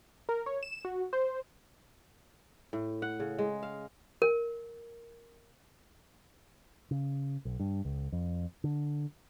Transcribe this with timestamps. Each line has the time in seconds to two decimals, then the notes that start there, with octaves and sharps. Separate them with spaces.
0.29 A#4
0.46 C#5
0.63 E7
0.85 F#4
1.13 C5
2.73 A2
3.02 F#5
3.20 C#3
3.39 G#3
3.63 F5
4.22 A#4
6.91 C#3
7.45 B1
7.60 G2
7.85 C#2
8.12 F2
8.64 D3